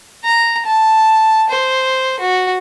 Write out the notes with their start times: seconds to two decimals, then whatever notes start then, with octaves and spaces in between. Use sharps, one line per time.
0.24 A#5
0.67 A5
1.50 C5
2.20 F#4